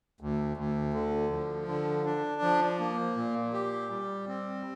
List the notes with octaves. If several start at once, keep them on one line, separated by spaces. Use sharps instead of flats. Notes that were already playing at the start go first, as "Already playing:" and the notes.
D2
D2
D3
F3
D3
D4
F3
A#3
A#2
G4
G3
C4